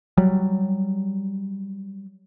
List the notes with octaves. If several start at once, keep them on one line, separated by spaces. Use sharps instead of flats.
F#3 G3